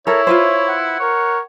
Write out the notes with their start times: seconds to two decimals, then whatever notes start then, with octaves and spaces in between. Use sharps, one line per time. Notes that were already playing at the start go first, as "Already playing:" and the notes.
0.07 E4 A4 A#4 C#5 E5
0.27 F4 B4 C5
0.68 F#5
1.00 A#4 C#5